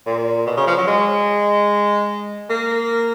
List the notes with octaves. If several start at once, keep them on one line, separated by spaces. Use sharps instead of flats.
A#2
B2
C#3
F3
F#3
G#3
A#3